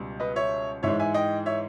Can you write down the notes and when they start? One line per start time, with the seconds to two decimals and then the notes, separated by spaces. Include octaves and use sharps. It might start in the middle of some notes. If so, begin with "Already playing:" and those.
Already playing: C#2 B2 G3
0.20 B4 D#5
0.36 C#5 E5
0.83 G#2 E3 G#3 C#5 E5
0.99 E5 G#5
1.14 D#5 G5
1.46 C#5 E5